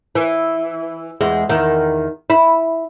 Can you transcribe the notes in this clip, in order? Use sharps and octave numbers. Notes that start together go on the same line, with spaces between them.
E3
E2 G#3
E2 D#3
E4